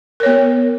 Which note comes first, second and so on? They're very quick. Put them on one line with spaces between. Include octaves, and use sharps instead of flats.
A#4 C#5 B3